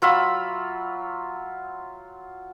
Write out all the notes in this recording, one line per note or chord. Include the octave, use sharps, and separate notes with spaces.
F#3 F4 E5 B5